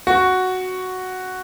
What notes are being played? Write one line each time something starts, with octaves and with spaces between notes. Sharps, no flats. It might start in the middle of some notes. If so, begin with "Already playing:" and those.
F#4